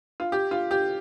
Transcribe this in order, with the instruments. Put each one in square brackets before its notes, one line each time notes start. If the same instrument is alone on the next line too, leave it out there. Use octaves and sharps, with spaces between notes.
[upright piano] F4
G4
F4
G4